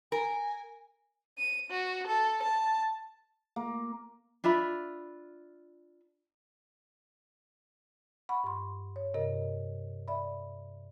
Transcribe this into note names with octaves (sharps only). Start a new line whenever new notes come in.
A#4 G#5
D#7
F#4
A4
A5
A#3
D4 F4 E5 B5
F#5 B5 C#6
G2 C6
C#5
G2 C3 A#4 D#5
D5 E5 B5